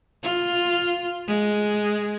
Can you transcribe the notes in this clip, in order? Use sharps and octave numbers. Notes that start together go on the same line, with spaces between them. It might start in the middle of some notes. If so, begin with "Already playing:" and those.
F4
G#3